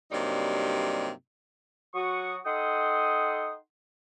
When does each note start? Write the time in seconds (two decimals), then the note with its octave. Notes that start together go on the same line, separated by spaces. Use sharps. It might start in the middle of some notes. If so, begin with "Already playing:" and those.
0.11 G2 C3 F#3 G3 A#3 D#4
1.94 F#3 F#4 F#5 C#6 D#6
2.45 D#4 A4 F#5 G5 C6 D#6